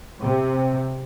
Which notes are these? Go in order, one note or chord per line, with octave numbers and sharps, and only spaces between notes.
C3